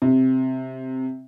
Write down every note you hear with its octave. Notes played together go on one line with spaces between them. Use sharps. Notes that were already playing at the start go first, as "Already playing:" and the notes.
C3